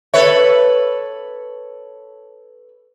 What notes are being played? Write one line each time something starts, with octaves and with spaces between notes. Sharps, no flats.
A4 B4 C#5 E5